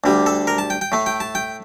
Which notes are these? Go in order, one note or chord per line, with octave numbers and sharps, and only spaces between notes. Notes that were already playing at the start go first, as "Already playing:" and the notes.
D2 D3 G3
A4
A#4
A5
G5
G5
A2 A3
G5
A5
G5